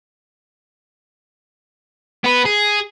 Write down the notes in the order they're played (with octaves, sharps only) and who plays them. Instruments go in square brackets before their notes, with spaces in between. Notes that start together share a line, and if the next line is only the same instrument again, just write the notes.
[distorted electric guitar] B3 B4
G#4